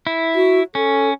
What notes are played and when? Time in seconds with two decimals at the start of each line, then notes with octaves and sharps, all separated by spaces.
0.07 E4
0.35 F#4
0.75 C#4 A4